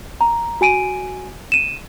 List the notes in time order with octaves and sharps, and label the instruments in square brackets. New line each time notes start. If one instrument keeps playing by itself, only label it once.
[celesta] A#5
F#4 G#5 D7 D#7
D#7 E7